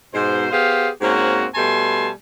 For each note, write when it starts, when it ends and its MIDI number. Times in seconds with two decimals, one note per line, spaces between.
0.14 0.48 44
0.14 0.48 47
0.14 0.48 72
0.52 0.88 59
0.52 0.88 67
0.52 0.88 68
0.52 0.88 72
0.52 0.88 77
1.01 1.46 44
1.01 1.46 58
1.01 1.46 60
1.01 1.46 61
1.01 1.46 66
1.55 2.09 47
1.55 2.09 55
1.55 2.09 57
1.55 2.09 80
1.55 2.09 81
1.55 2.09 84